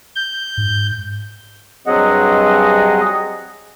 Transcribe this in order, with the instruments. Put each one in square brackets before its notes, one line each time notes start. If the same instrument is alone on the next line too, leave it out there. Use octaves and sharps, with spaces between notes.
[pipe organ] G6
[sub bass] G#2
[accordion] G2 F#3 C4 G#4 D#5 F#5